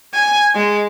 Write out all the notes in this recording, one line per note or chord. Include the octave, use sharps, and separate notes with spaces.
G#5
G#3